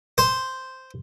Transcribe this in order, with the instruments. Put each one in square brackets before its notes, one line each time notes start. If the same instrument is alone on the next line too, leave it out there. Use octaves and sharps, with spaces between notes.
[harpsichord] C5